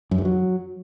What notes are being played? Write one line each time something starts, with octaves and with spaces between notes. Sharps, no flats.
F#2
G2
F#3